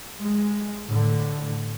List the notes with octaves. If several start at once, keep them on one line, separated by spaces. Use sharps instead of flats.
G#3
A2 D3